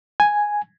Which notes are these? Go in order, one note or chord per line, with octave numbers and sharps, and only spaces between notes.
G#5